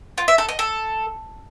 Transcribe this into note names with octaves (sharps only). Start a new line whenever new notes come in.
F4
E5
A4
D#5
A4